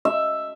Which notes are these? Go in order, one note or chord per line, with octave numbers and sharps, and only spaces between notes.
E5